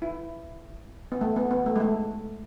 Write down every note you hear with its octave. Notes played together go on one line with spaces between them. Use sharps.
E4
B3
A3
B3
B3
A3
G#3
A3